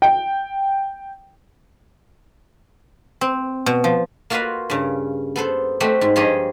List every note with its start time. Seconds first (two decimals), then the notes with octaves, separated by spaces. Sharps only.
0.02 G5
3.21 C4
3.66 B2
3.84 F3
4.30 A#3 F4 F#4 A#4 B4 F5
4.70 G2 C#3
5.36 B3 A4 C5
5.80 A3 C4 F#4 G4 G5
6.01 G#2
6.16 G2 F3 G4 G#4 C#5 D#5